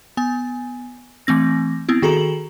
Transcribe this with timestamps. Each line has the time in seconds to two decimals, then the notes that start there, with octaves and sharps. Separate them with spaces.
0.17 B3 G#5
1.27 E3 A3 C4 A#6
1.89 B3 C4 E4
2.02 D#3 F#4 G#4 A4 A#5 F#7